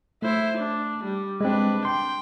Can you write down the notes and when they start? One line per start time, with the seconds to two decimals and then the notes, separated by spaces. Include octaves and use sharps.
0.22 A3 E4 C5
0.57 D4
1.03 G3
1.41 G#3 C4 D4 B4
1.85 G5 C6